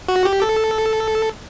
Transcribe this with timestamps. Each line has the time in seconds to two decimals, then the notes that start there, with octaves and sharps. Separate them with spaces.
0.08 F#4
0.25 G4
0.42 A4